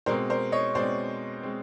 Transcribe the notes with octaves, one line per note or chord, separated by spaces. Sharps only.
B2 G#3 C4 A#4 C5
A#4 C5
C#5 D#5
B2 G#3 C4 C5 D5
G#3 C4